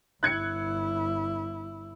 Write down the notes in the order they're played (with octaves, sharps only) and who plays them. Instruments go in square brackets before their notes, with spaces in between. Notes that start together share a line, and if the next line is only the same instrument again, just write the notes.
[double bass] G1 E4 [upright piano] F#6 G#6 C#7